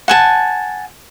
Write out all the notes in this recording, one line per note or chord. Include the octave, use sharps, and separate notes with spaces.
F#5 G#5 A5